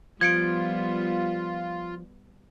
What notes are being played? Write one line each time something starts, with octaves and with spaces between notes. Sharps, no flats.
F3 G3 B3 F4 G#6 C#7 D7